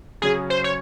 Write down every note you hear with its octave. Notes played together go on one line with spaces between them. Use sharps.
C#3 F#3 C#4 G#4
C5
C#5